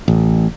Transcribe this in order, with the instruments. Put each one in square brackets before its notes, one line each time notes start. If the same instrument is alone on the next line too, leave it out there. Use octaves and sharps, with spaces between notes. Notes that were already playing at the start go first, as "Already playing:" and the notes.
[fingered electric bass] A1